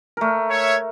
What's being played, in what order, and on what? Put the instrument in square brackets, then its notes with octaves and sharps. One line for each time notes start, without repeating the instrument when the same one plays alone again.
[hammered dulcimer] A3 A#4
[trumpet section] C#5 E5